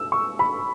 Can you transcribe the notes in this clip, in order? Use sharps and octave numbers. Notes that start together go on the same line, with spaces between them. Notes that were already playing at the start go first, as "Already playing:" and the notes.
Already playing: E6
C#6
B5